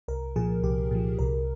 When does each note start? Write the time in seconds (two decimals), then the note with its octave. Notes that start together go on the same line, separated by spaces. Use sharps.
0.08 C2 A#4
0.36 A#2 F3 G#4
0.63 C2 G4
0.91 A#2 F3
1.19 C2 A#4